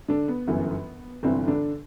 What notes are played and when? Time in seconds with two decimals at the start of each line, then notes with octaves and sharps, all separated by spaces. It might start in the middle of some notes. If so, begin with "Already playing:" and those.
0.08 D3 D4
0.28 B3
0.48 G1 F#2 E3
1.23 G1 G2 C3 E3 C4
1.48 D3 D4